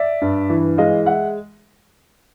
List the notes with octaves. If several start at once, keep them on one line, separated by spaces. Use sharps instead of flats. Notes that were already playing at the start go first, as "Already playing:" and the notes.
Already playing: D5 E5
G2
E3
G#3 D#5 F5
E5 F#5